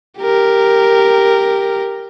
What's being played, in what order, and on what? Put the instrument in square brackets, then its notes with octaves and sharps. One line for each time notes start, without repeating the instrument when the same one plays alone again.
[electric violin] G4 A#4